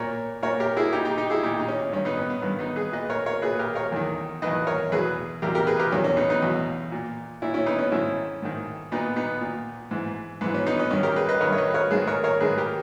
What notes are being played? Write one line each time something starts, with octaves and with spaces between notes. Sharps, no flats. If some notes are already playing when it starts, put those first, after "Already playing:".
Already playing: A#2 A#4 C#5
A#2 A#4 C#5
G4 A#4
E4 G#4
A#2 D#4 G4
D#4 G4
D#4 G4
E4 G#4
A#2 D#4 G4
D#4
C#4
G2 D#3 C#4
B3 D#4
C#4
B3
G2 D#3 B3
B3 D#4
G#4 B4
A#2 B4 D#5
A#4 C#5
A#4 C#5
A#2 G#4 B4
G4 A#4
A#4 C#5
E2 D#3
E2 D#3 B4 D#5
A#4 C#5
E2 B2 G#4 B4
E2 B2 G4 A#4
G4 A#4
G#4 B4
G4 A#4
E2 B2 C#4
C#4
B3 D#4
B3 D#4
E2 B2
A#2
A#2 C#4 E4
C#4 E4
B3 D#4
C#4
G#2 D#3 C#4 E4
G#2 D#3
A#2 B3 D#4
B3 D#4
A#2
G#2 E3
G#2 E3 B3
C#4
B3 D#4
C#4
G2 D#3 C#4
G4 A#4
G#4 B4
B4 D#5
G2 D#3 A#4 C#5
C#5
B4 D#5
B4
A#4 C#5
G#2 D#3 G#4 B4
A#4 C#5
A#4 C#5
G#2 D#3 G#4 B4
G4 A#4